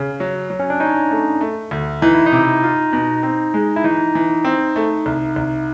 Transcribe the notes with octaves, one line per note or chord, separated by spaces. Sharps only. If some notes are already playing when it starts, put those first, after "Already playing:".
Already playing: C#3
F#3
F#3
C#4
D4
C#4 D#4
A3
A3
D2
E3 D#4
E4
D#4
C3
F4
B2
C4
G#3
E4
E3 D#4
E3
C4
A3
C2
C2